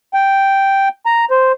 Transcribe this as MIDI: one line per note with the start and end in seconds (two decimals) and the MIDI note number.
0.14 0.89 79
1.06 1.25 82
1.30 1.52 72